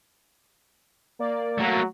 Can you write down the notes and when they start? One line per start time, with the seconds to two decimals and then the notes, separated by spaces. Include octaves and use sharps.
1.19 A#3 D5
1.60 F#3 A3 A#3 F#4